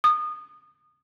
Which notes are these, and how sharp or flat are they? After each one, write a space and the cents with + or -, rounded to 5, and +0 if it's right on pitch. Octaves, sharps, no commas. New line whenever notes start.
D#6 -25